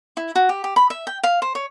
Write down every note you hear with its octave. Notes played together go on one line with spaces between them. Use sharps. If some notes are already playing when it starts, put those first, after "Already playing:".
E4
F#4
G4
G4
B5
E5
G5
F5
C5
C#5